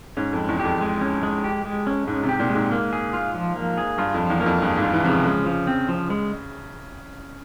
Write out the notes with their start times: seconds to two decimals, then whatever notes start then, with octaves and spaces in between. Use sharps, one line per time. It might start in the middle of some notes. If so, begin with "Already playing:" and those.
0.17 G#2 C#4
0.33 F2
0.38 G#3
0.48 E2
0.59 G4
0.65 F2
0.81 G#3
1.01 C#4
1.23 G#3
1.44 G4
1.65 G#3
1.87 C#4
2.07 G#2 G#3
2.23 C3
2.29 G4
2.40 A#2
2.50 G#3
2.55 G#2
2.72 A#3
2.93 G#4
3.13 F4
3.34 F3
3.56 A#3
3.78 G#4
3.98 G2 F4
4.14 F2 F3
4.30 E2
4.41 A#3
4.46 F2
4.62 G2 G#4
4.78 G#2
4.83 F4
4.93 E3
5.05 C3 F3
5.09 C#3
5.25 C#3 G#3
5.46 F3
5.67 C4
5.89 F3
6.10 G#3